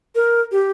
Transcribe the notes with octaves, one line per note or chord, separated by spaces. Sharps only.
A#4
G4